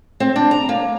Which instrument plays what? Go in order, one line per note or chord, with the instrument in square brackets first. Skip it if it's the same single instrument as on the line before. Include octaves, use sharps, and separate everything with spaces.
[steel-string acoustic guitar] C4
D4
A#5
A#3